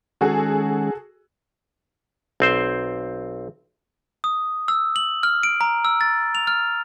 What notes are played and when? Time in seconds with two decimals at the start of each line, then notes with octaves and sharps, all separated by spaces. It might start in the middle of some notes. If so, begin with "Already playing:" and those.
0.21 D#3 G#3 C#4 F#4 G#4 A4
2.40 B1 C4 C5
4.24 D#6
4.68 E6
4.96 F#7
5.23 F6
5.43 D7
5.61 A#5
5.85 E6
6.01 A6
6.35 F7
6.47 F6